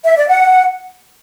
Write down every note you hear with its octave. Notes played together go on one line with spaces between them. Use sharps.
E5
D5
F#5